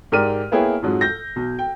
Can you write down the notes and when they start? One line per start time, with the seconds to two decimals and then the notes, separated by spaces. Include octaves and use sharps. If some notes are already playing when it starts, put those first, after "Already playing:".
0.12 G#2 G4 A#4 D5 F6 D#7
0.51 A#3 B3 E4 G#4 C#5 G5
0.82 F2 G#2 F#3
1.01 G6 A#6
1.36 B1
1.59 G5